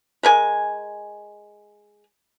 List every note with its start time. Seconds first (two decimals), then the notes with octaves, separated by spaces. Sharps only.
0.23 G#3 A#4 G#5